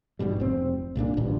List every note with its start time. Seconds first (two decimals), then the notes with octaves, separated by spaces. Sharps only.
0.19 G#1 G#2 B2 G3
0.40 F1 C4
0.96 C2 A#2 G3 D4
1.17 A1 D2 G2 A#2